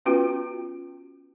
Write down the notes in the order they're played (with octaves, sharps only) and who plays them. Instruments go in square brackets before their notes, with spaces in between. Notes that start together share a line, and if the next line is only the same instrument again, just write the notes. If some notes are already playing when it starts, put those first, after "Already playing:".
[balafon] B3 C#4 F4 F#4 B4 G5